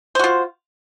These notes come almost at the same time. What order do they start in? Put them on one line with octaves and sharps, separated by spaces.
C5 F#4 F4